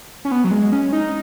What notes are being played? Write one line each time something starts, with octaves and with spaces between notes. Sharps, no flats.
C#4
B3
F#3
G#3
C#4
D#4